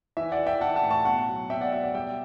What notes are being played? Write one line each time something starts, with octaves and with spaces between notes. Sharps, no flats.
E3 E5
D5 F#5
E3
E5 G5
E3 F#5 A5
F#5 A5
A2
A5 C#6
B2 F#5 A5
F#3
B2 E5 G5
D5 F#5
B2 E5
D5 F#5
G3 E5 G5